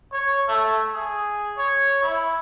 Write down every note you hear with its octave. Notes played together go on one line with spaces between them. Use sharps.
C#5
A3
G#4
C#5
E4